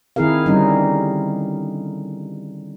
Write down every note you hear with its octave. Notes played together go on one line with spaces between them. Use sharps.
D#3 C4 E4 G#4 A#4 F5
D3 G3 C#4 D#4